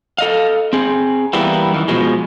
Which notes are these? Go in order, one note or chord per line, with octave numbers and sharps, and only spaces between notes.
A4 D#5 F5
C4 G#4
E3 G3 A#3 B3 E4
F#2 D#3 E3
B2 F3 G#3